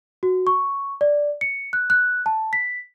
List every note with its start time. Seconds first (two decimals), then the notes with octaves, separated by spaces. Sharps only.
0.23 F#4
0.47 C#6
1.01 D5
1.41 C#7
1.73 F#6
1.90 F#6
2.26 A5
2.53 B6